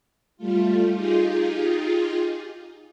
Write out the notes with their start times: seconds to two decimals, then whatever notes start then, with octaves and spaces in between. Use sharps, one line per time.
0.37 G3 A3 F4
0.94 D#4 F4 G4 G#4